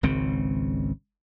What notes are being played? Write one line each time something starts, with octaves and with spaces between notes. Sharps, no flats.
G#1 C#2 C#3 C4